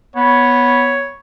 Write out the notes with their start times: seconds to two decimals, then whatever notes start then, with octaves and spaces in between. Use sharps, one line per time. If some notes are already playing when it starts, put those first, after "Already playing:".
0.16 B3 C#5